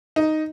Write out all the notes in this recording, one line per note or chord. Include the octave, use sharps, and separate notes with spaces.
D#4